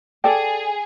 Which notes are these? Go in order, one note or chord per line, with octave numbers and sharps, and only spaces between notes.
G#4 A4 D5 G5